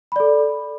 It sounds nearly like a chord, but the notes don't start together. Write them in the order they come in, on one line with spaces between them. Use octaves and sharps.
B5 D5 A4